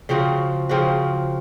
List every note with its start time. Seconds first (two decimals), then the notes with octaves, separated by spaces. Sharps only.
0.09 C#3 F3 C4 F#4
0.69 C#3 F3 C4 F#4